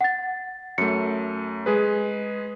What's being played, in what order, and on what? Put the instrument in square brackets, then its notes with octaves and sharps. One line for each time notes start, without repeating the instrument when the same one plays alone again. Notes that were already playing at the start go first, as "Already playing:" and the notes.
[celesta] F#5 A6
[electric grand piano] F#2 A3 [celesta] C#7
[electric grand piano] G#3 G#4 B4